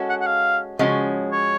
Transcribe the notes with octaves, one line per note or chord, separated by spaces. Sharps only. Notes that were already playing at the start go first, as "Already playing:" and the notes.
Already playing: G#3 C#4 F#4 A4
F#5
F#5
F5
C#3 F3 G#3 C#4 F#4
C#5